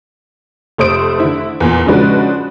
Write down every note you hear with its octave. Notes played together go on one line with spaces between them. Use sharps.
F1 A3 C5 D#6 D7
D3 E4
E2 A#2
C#3 F3 G#3 D4 F#4 B4